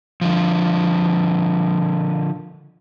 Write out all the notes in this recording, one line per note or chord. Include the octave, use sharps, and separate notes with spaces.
D3 F3